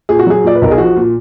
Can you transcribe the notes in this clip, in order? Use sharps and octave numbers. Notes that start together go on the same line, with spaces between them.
A#2 G#4
F#4
F#3 G#4
A#2 D5
B4
B1 A#4
G#4
F3 F#4
A#2